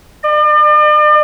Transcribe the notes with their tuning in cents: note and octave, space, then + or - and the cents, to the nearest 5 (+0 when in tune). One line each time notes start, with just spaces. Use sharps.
D5 +45